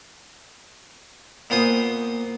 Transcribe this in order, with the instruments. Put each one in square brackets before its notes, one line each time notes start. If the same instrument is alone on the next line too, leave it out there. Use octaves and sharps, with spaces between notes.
[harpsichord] A#2 B3 C5 D#6